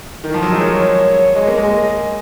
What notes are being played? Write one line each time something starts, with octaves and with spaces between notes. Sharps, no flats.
D#3 A#4
F3
F#3
G#3
F#3 C#5
G#3 D#5
A#3
G#3